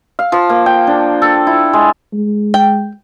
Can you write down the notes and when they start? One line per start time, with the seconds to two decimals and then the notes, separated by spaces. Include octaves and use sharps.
0.19 F5
0.32 F3
0.49 A#3
0.66 G5
0.87 D4
1.22 A4
1.47 E4
1.73 G#3
2.13 G#3
2.54 G5